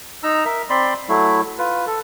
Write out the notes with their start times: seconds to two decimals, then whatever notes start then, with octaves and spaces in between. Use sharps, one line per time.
0.23 D#4 A#5 E6
0.45 A#4 E5
0.70 C4 D5 B5 C6
1.09 F#3 A3 E4
1.58 F4 B4
1.87 A4